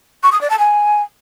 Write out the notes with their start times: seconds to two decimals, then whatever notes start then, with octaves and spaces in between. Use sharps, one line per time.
0.23 C#6
0.32 D#6
0.41 D5
0.50 A5
0.59 G#5